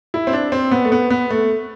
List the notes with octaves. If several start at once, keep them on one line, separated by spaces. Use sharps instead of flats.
E4
C4
D4
C4
B3
A3
B3
B3
A3